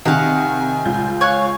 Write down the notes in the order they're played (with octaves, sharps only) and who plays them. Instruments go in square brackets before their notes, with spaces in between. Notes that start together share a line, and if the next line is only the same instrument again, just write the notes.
[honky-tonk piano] C3 D#3 [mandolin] F5 F#5 [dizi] G#5
[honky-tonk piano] C#2 F4 G6
[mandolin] C#5 G#5 F#6 [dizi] F5